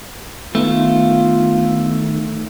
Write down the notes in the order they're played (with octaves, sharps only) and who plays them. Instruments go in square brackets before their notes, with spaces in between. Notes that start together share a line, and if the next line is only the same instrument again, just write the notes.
[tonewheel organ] D#3 [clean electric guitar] A3 [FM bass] B3 [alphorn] F4